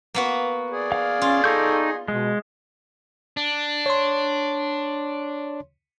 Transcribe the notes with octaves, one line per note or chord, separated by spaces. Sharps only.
A#3 B3 F#4
G#4 D5
F5
C#4 F4
D#4 A4 C#6 G6
B2 G#3
D4
C#5 C6